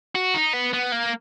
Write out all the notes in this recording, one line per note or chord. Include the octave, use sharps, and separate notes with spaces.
F#4
D#4
B3
B3
A#3